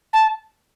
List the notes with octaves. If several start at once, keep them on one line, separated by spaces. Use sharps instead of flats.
A5